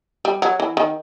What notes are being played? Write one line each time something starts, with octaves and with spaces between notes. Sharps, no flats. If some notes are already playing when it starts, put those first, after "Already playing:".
G3
F#3
E3
D#3